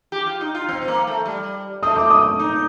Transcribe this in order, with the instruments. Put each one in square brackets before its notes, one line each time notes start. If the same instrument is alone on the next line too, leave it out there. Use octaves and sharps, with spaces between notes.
[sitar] G4
F4
D#4
F4
C4
C4
A#3
A3
G3
[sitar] A3 [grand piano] D#6
[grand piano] D6
D#6
[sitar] D#4